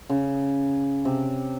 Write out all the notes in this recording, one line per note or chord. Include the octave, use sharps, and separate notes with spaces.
C#3
C3